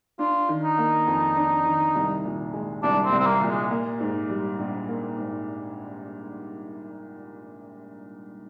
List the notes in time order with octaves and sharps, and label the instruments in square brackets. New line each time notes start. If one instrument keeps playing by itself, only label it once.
[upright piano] D4 [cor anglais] F4
[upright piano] D#3
[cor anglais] D#4
[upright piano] A#3
F2
D4
D#3
C2
A#2
G#3
[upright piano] C2 [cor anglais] D4
[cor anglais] C4
[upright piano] C2
[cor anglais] C4
A#3
[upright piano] A#2
[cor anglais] G#3
[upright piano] A#3
G#2
G3
A#1
A#3
G#2